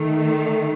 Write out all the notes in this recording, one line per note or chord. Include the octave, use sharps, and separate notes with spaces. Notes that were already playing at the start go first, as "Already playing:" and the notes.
Already playing: D#3 A3